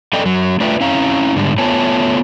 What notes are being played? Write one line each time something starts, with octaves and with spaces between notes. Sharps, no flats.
F#2 A4 D5 D#5 G5
F#2 F#3
A3 D4 F4 B4 E5 G5
C4 C#4 E4 F5 A#5
G#2 D3 G3
A3 B3 F4 C#5 G#5 A5